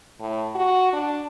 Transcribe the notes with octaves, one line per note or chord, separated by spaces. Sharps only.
A2
F#4
D4